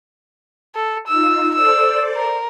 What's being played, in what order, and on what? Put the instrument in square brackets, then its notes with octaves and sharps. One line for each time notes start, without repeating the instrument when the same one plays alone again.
[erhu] A4
[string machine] D#4 F4 [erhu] E6
[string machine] A4 C5 D5 [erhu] E6
[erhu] A#4